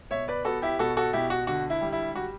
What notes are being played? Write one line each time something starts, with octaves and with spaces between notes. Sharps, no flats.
B2 C#5 E5
B4 D5
B3 F#4 A4
E4 G4
B2 F#4 A4
F#4 A4
B2 E4 G4
F#4
D3 F#4
E4
G3
E4
G3 F#4